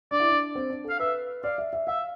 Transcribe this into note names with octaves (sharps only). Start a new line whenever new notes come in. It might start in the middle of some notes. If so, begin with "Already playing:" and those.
D4 D5
E4
D4
C4
D4
A4
F5
B4 E5
D5 F5
E5
E5
E5 F5